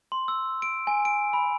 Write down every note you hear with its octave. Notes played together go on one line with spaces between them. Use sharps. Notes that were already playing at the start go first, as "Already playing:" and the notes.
C6
E6
D7
G#5
D7
B5